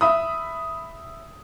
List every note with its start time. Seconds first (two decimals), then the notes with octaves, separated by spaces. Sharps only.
0.01 E5 B5 D#6